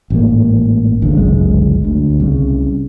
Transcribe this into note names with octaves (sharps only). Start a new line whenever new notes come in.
A1 G#2 A#3
G#1 C#2 D3
G1 C#2 F#2 G#3
D2
C2 C#3